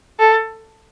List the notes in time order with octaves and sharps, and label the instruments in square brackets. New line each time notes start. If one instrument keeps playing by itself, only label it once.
[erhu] A4